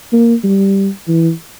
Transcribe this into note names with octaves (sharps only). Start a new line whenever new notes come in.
A#3
G3
E3